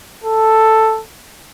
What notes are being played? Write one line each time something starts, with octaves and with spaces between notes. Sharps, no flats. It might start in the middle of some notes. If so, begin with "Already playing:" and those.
A4